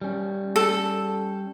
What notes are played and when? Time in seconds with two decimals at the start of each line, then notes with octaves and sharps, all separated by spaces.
0.02 G3 C#4
0.56 A4